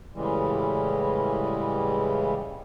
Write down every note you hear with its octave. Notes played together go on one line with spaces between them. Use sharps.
A2 C#3 E3 G3 G#3